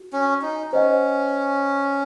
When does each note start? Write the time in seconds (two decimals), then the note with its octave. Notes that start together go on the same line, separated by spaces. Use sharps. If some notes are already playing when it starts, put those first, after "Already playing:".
Already playing: F#4
0.13 C#4
0.42 D#4
0.72 C#4 C5 D#5 F#5